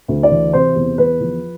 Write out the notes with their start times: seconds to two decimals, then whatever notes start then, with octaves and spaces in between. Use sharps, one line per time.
0.08 D2
0.23 D5
0.31 E3
0.53 C3 C5
0.76 E2
0.98 E2 B4
1.20 F3